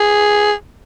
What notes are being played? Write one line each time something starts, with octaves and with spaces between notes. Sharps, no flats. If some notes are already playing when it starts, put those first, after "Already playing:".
Already playing: G#4